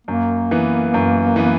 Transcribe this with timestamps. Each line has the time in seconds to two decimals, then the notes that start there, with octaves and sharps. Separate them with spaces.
0.07 F#2 A#3
0.51 E3 B3
0.94 F#2
1.36 E3 B3